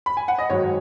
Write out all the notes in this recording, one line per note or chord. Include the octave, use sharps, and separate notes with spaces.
B5
G#5
F#5
D#5
G#2 D#3 F#3 C#5